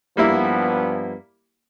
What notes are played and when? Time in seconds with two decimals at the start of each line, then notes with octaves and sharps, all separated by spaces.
0.17 G2 F3 G3 A#3 B3 E4